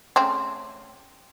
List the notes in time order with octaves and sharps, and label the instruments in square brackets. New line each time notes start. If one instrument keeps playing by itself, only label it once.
[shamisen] C#3 A3 C4